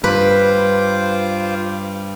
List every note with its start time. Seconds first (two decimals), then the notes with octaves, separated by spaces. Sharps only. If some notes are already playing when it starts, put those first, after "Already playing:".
0.04 G2 F4 B4 C5 D6